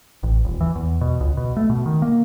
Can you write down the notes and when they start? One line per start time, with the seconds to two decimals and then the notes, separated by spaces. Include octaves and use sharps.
0.23 A1
0.45 D#1
0.61 E3
0.75 E2
1.01 B2
1.21 C#2
1.37 B2
1.57 A3
1.70 B2
1.86 D#3
2.02 A#3